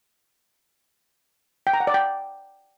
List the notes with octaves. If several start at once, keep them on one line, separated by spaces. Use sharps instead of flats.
G5
A#5
F#5
D5
G5